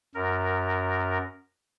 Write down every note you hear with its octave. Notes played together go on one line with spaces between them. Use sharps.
F#2 A#4